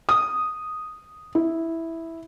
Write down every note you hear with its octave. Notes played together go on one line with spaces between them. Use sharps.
D#6
E4